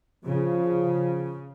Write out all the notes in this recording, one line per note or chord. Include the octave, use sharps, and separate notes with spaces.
C#3 F3